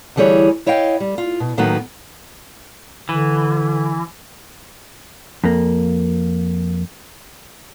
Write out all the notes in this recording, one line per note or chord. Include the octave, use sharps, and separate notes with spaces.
D2 D3 E3 G3 G#4 C#5
E4 C#5 D#5 F5 G5
G3
F4
B2
A2 D#3 F#3 A#3 B3
D3 E3
F2 A#3